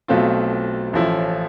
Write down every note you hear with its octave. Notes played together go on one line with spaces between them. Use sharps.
B1 B2 A3 C4 F4
A1 A2 F3 A3 E4